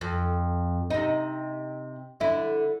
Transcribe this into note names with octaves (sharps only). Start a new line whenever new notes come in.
F2
C3 D#4
D3 E4